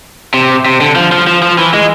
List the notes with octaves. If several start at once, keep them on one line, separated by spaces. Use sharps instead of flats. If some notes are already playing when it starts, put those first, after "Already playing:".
C3
C3
D3
F3
F3
F3
F3
E3
G#3